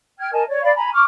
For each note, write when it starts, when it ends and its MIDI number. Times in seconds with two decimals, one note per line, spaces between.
0.19 0.30 79
0.19 0.30 89
0.19 0.30 92
0.32 0.43 70
0.32 0.43 75
0.32 0.43 80
0.32 0.43 81
0.47 0.61 73
0.47 0.61 74
0.62 0.72 74
0.62 0.72 77
0.62 0.72 83
0.75 0.91 80
0.75 0.91 82
0.75 0.91 83
0.92 1.04 85
0.92 1.04 86
0.92 1.04 89